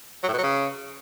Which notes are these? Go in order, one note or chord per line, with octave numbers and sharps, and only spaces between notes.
F#3
A2
B2
F#3
C#3